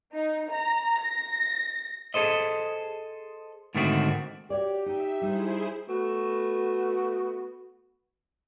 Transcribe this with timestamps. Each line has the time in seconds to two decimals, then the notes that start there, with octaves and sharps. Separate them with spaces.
0.15 D#4
0.51 A#5
0.97 A#6
2.14 G#4 A4 C5 D#5
3.75 G#2 D3 D#3 A3 C4 F#4
4.50 F#4 G4 C#5 D5
4.86 D#4 E5
5.21 G3 D#4 E4 G#4 C5
5.88 A3 B3 F#4